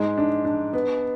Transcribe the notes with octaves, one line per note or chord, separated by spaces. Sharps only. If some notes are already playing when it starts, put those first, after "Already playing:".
Already playing: G#2 G#3
D4
D4
B3